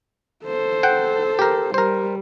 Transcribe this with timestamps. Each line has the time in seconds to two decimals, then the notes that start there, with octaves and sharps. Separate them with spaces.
0.45 A4 C5
0.83 F#5 G5
1.39 G4 A#4
1.74 G3 A#4 C5